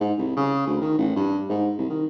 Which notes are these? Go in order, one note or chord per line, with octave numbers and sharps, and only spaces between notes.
G#2
C2
C#3
D2
D#3
A1
G2
G#2
C2
D#3